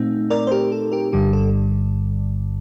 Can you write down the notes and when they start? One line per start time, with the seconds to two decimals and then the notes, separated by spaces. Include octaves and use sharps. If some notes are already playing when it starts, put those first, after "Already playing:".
Already playing: A#2 A3 C4 D#4
0.30 A#4 D5
0.47 C5
0.51 G4 A#4
0.72 A4
0.92 G4 A#4
1.12 G1 G2 D3 G3 G4
1.33 A4